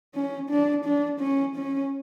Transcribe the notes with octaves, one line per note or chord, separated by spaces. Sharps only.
C#4
D4
D4
C#4
C#4